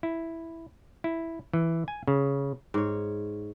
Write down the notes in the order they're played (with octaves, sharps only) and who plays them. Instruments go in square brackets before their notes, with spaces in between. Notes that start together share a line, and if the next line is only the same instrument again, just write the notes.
[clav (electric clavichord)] E4
E4
E3
G#5
C#3
[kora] G#2 C#5